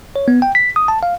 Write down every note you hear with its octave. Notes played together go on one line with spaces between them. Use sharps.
C#5
B3
G5
B6
D#6
A5
F5